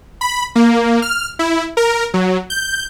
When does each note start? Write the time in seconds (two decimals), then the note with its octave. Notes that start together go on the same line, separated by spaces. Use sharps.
0.21 B5
0.55 A#3
1.02 F6
1.39 E4
1.77 A#4
2.14 F#3
2.50 G6